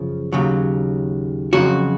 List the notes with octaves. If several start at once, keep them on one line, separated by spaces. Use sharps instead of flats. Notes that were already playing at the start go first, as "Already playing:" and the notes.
Already playing: F#2 C#3 F3
D#2 C#3 F#3
F2 C#3 F#3 F#4